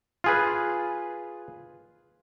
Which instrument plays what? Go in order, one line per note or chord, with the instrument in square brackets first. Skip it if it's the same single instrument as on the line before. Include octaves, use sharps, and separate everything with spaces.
[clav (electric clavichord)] F4 G#4 B4